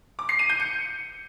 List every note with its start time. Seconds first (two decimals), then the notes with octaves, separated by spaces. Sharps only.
0.19 D6
0.29 C7
0.39 D#7
0.49 G6
0.60 C#7